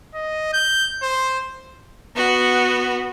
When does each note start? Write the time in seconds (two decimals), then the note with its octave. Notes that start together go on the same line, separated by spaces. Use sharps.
0.14 D#5
0.54 G6
1.03 C5
2.16 B3 F#4